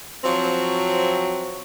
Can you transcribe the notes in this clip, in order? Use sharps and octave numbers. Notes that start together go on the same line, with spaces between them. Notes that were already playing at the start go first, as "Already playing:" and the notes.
F3 F#3 C4